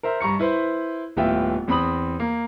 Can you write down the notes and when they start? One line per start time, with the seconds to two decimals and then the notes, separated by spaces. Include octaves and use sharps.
0.03 A#4 C5 E5
0.21 G2 A#5 C#6 C#7
0.39 E4 B4 C5
1.17 D#1 A2 B3 F4 E5 G5
1.68 E2 C4 B5 D#6 F#7
2.20 A#3